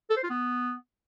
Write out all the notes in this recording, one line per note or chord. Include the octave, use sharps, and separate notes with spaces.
A4
C5
F4
B3